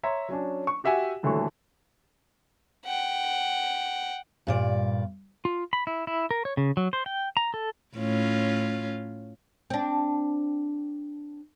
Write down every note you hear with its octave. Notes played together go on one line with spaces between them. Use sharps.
C#5 E5 A#5 C6
F#3 C#4 D4
C#6
F#4 G4 E5 F#5 G#5
D#1 D3 E3 F#3 A3 C#6
F#5 G5
G2 A#2 D5
F4
B5
E4
E4
A#4
C#5
C#3
F#3
C5
G5
A#5
A4
A2 C#4 F4
C4 D4